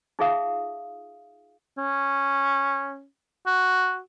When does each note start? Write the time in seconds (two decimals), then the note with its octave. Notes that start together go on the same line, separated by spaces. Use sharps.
0.19 D#4 F4 G#4 E5 F5 D#6
1.78 C#4
3.47 F#4